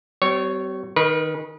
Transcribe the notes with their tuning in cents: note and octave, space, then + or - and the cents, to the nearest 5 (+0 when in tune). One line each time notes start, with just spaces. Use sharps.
G3 -40 C4 -35 C#5 +0
D#3 +0 B4 -35